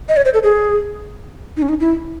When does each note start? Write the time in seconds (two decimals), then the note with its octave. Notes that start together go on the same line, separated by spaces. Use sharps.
0.09 D#5
0.17 C#5
0.25 C5
0.34 A4
0.44 G#4
1.57 D#4
1.62 C#4
1.69 D#4
1.80 E4